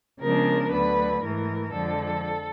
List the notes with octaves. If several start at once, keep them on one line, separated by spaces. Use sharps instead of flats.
C#3 F3 G#3 B3 D4 A#4
D2 D3 F#3 B4
G#2 E3 A3 A#4
F2 D3 F3 G#3 A4